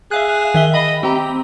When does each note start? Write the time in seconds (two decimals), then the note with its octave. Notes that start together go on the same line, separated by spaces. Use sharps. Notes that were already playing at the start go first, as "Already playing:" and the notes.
0.11 G#4 E5 F5 F#6
0.54 D#3 E5 G7
0.74 D#5 B5
1.03 C4 G4 A#5